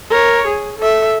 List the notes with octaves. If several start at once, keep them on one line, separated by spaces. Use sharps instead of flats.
A#4 C#5
G#4
A4 E5